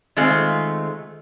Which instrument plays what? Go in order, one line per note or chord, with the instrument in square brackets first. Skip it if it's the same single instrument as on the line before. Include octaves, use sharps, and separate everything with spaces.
[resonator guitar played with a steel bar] D#3 G#3 A3 C4 F4